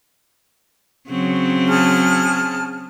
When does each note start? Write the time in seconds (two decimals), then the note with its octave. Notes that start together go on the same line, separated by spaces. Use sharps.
1.10 C#3 F#3 C4
1.68 G#4 A5 F6